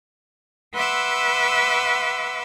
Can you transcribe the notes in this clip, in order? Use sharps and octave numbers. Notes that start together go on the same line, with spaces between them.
B4 E5 F#5 C6 D6 E6